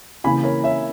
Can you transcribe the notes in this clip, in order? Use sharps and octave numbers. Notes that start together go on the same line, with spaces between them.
C#3 E3 A#3 G#5 B5
A#4 C#5
C#5 E5